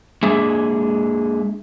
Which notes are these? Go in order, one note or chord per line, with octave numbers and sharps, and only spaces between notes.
G#3 A#3 D4 G#4 E5